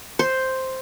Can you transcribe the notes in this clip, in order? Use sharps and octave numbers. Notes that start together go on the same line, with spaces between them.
C5